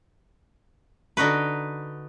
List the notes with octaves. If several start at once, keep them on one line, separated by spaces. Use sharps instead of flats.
D3 D#4 F#4 B4